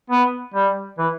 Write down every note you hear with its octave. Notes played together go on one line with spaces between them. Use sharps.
B3
G3
E3